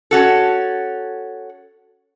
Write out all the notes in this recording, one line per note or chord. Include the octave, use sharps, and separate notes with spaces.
C#4 F#4 A4